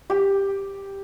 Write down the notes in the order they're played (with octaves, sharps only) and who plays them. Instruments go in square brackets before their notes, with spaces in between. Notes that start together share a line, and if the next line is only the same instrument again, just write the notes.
[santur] G4